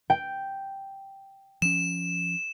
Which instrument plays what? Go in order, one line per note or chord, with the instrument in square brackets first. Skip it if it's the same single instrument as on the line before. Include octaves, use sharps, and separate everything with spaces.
[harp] G5
[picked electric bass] F3 C#4 [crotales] E7